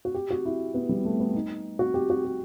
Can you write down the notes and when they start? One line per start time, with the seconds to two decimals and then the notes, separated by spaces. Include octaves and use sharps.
0.05 F#4
0.14 G4
0.30 F#4
0.45 E4
0.74 B3
0.89 G3
1.05 A3
1.20 B3
1.35 D#4
1.79 F#4
1.94 G4
2.10 F#4
2.25 G4